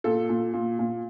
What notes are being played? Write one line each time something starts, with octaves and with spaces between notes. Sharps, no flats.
A#2 A4
A#2
A#2
A#2